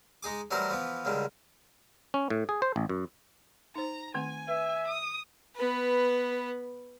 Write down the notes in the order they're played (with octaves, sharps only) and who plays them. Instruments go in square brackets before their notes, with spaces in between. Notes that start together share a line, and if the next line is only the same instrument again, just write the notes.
[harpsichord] G#3 D#4 G#4 D6
E3 F#3 G3 A3 A#4 C5
E3 F3 B3
C#2 D3 D#3 G3
[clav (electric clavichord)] C#4
A2
G#4
C5
A1
F#2
[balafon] D#4 C5 [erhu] A#5
[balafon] D#3 A3 C4 [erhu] G#5
[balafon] B4 [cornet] E5
[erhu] D#6
[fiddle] B3 B4